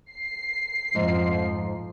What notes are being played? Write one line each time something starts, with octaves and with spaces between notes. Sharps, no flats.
C7
F2 G#2 F3